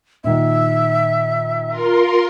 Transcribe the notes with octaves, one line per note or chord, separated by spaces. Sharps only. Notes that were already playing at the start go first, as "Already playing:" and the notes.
A#2 D#3 E5
F4 A#4 C6